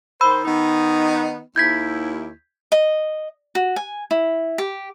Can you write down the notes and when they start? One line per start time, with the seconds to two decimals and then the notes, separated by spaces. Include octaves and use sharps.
0.21 D#3 C5 B5 E6
0.44 D#3 B3 D#4
1.56 D#2 E4 G6 G#6 B6
2.72 D#5
3.55 F#4
3.76 G#5
4.11 E4
4.58 G4